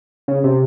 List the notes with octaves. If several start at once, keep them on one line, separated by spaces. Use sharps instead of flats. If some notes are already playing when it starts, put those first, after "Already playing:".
C#3
C3